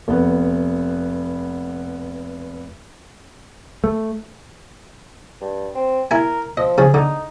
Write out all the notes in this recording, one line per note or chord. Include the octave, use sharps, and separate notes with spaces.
F1 B3
A3
G2
C4
E4 A#4 G#5
F3 D#5
C#3 F3 G#4
D3 D#4